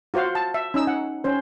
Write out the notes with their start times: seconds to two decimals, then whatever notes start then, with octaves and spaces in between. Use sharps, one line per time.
0.14 F4 F#4 C5 F5 F#5
0.35 A5
0.54 E5
0.74 C#4 D#4 E6
0.87 F#5
1.24 C#4 C5